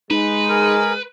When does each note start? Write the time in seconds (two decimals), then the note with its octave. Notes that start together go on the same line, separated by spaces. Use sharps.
0.11 G#3 D#4 B4
0.49 G#4 A#4